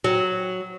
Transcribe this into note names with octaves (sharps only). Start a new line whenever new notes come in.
F#3